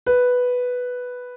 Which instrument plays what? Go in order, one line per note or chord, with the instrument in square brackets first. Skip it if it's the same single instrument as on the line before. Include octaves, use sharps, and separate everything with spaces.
[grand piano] B4